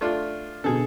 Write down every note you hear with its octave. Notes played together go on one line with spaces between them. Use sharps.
A3 D4 F4 D5 F6
B2 D3 G#4 A4